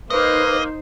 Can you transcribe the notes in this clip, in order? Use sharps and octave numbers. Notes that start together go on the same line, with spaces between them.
A#3 D#4 B4 C5 D#5